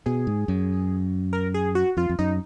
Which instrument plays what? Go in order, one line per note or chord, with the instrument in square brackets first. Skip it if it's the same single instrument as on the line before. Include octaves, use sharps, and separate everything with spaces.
[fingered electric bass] B2 [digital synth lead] G#4
[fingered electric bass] G#2
F#2
[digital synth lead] A#4
G#4
F#4
[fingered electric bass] F2 [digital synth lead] F4
[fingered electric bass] F2
[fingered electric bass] F#2 [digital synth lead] D#4